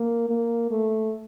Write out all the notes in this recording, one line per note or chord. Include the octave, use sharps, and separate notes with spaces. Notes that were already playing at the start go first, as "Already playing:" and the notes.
Already playing: A#3
A#3
A3